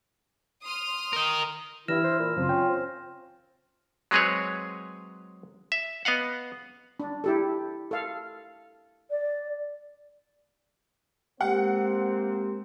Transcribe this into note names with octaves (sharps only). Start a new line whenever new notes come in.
C6 D#6 F6
A#4 D#5
G2 E3 E4 F6 A#6 E7
C5
A#2
F#2 C#3 F3 C4 F4
C#4 G5
C4
F#3 G#3 C4 G#4 B4 C#5
E5
B3 D#5 F5 F#5
D4
E4 G4 A4
A4 F5
D5
G#3 A#3 C4 G4 C5 F#5